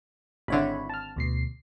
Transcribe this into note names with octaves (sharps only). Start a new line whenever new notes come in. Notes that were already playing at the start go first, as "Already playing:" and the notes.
G#1 D3 E4 C#5 B5
A5 F6
D2 B2 C7